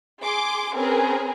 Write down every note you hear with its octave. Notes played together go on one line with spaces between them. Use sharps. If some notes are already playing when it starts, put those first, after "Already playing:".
G#4 C6 D6
C4 C#4 G#4 A#4 B4